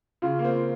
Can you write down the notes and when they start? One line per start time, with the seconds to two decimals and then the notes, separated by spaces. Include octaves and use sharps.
0.22 C#3 F4
0.39 A#3
0.44 C4